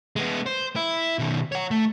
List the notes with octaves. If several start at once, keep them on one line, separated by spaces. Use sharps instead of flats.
G#3 B3
C5
E4
B2 D#3
C#5 F#5
A3